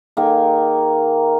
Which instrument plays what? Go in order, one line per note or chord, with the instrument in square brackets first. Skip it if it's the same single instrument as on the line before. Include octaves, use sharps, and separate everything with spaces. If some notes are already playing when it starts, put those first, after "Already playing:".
[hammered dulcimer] D#3 A#3 D#4 G#4